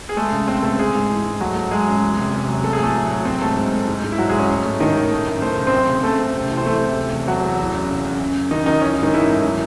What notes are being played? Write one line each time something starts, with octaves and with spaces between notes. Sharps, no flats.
G#4
G#3 A3 A4
C#3
G#3 C4 C5
C#3 A3 A4
G#3 G#4
G#2
E3
G#2
F#3 A3 F#4
A3
F#3 G#3 G#4
F#2
E2
C3
C3
F#3
A3 A4
G#4
A2 A3 A4
F#3
F#3
F#3 C4 C5
G#2 A3 A4
G#2
A3
G#2
G#2
E4
F#3 F#4
G#3 G#4
G#2
C#4
A2
A3
A2 D#3 D#4
A2
A3
F#2
A3 C5
C#3
C4 C5
F#2
C#3
F#2 A3 A4
F#2
C3
E3
C5
E3 A3 A4
C3
A3
E2
F#3 A3 F#4
E2
E3
F#2
C#3
F#2
F#2
F#2
F#2 D#3 D#4
F#2 D#3 D#4
E3 C#4
G#2 D#3 D#4
G#2 E3 E4
A3
F#3